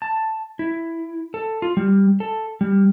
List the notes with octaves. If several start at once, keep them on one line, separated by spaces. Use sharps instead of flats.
A5
E4
A4
F4
G3
A4
G3